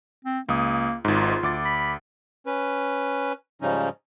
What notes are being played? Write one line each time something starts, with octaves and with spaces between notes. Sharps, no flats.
C4
C#2 A#3 D#6
G#1 G#2 F4
D2 D6 A6
B5
C#4 B4
G#2 C#3 F3 G3 C#4 D#4